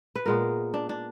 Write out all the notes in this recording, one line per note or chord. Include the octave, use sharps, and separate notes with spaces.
B4
A#2 G#3 B3 A#4
D4
D4